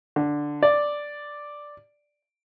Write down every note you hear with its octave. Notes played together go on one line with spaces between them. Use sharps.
D3
D5